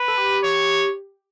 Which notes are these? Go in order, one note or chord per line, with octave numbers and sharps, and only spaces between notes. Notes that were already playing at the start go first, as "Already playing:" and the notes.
Already playing: B4
A4
G4
C#5